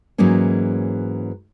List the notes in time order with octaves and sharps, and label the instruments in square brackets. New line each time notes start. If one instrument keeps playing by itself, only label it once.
[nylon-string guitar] G#2 E3 F#3 G#3 A#3 C#4